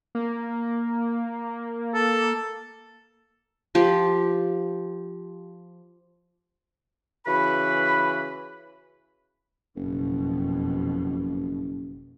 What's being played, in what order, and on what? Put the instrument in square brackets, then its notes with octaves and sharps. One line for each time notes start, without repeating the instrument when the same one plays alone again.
[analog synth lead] A#3
[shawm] A4
[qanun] F3 G4
[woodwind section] C#3 E3 F#4 B4 B5
[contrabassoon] F#1 [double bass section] F2 B2